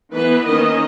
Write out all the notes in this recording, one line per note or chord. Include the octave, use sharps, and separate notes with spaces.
E3 B3 B4
D#3 A#3 C#4 D#5